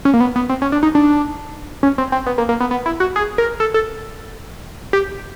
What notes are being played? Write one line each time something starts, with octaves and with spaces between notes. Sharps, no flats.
C#4
A#3
B3
B3
C4
C#4
D4
D#4
D4
C#4
C4
C4
B3
A#3
A#3
B3
B3
E4
F#4
G#4
A#4
A4
A4
G4